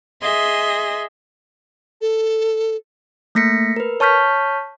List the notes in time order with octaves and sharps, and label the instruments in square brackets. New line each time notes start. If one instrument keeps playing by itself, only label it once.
[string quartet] G#4 D#5 E5 C6
[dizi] A4
[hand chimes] A3 A#3 A#6 B6 C#7
A#4 B4
C#5 A5 C#6 F6 G6 B6